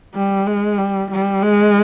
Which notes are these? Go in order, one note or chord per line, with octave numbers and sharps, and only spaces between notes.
G3
G#3
G3
G3
G#3